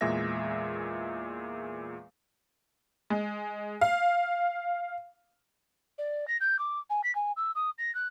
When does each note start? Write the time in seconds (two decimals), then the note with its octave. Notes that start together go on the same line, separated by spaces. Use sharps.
0.01 E2 A#2 G#3 G#4 E5 A#6
3.10 G#3
3.81 F5
5.98 D5
6.28 A#6
6.40 G6
6.59 D6
6.90 G#5
7.04 B6
7.15 G#5
7.36 E6
7.55 D#6
7.78 A#6
7.95 F#6